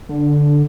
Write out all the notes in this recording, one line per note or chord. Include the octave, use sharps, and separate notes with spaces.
D3